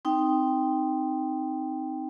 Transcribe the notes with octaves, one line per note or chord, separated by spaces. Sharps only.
C4 D#4 G5